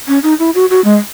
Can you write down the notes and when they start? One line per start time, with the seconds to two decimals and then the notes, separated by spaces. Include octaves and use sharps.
0.08 C#4
0.23 D#4
0.40 E4
0.55 F#4
0.70 F#4
0.85 G#3